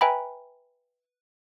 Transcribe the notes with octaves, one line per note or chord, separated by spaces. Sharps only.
B4 E5 G5 G#5 A#5 B5